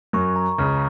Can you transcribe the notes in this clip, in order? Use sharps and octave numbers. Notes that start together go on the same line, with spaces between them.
F#2 F#3 C#6
A#5
C#2 C#3 F6